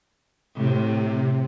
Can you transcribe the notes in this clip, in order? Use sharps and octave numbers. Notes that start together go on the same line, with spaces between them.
A2 C3